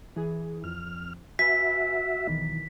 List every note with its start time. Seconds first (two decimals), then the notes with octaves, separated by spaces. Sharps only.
0.16 E3 G#4
0.64 F2 F6
1.39 F#4 B4 E5 G#5 B6
2.27 B1 D#3 E3